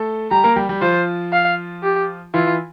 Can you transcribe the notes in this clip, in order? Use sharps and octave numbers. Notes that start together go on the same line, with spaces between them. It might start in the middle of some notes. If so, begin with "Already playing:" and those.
Already playing: A3 A4
G3 G4 A#5
A#3 A#4
G3 G4
G3 G4
F3 F4 C5
F5
G4
E3 E4 F4